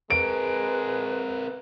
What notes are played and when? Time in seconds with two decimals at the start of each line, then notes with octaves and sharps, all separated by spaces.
0.10 G#3 C4 A#4 B4 D7